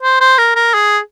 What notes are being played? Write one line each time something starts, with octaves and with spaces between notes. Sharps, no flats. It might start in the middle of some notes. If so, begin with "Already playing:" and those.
C5
C5
A#4
A#4
G#4